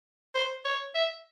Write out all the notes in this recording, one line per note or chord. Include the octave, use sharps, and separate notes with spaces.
C5
C#5
E5